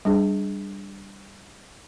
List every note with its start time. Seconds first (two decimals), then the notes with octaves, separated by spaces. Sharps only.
0.05 G3 D4 G#4